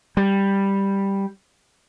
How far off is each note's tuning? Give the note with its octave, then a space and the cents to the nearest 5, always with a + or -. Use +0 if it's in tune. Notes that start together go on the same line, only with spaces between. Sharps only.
G3 +5